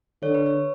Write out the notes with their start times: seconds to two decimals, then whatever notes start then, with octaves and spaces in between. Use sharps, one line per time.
0.22 D3 C#5
0.34 B4
0.46 C#5